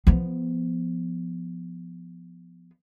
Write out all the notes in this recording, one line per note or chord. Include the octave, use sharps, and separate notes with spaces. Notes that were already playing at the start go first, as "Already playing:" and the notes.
F3 B3